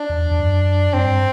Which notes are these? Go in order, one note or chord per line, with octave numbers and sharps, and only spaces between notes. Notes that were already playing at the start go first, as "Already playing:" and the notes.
Already playing: D4
E2
E2
F#2
G2 C4